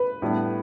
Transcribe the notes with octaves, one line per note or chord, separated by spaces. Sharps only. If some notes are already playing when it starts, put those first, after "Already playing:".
Already playing: B4
A2 G3 B3 D4